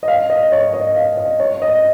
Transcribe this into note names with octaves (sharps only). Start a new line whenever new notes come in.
D#5
F5
D#5
C#5
D#5
F5
D#5
C#5
D#5